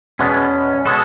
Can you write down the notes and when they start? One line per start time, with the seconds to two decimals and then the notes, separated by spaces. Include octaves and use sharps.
0.19 E2 B2 G#3 B3 C#4
0.85 B2 G#3 B3 F#4 A4